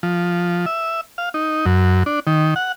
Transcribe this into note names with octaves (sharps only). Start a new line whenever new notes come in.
F3
E5
F5
D#4
F#2
D4
D#3
F#5